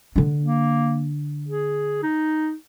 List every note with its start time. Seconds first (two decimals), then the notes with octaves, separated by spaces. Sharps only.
0.16 D3 D4
0.43 A#3
1.48 G#4
2.03 D#4